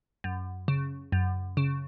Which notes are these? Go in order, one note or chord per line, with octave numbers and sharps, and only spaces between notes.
F#2
C#3
F#2
C#3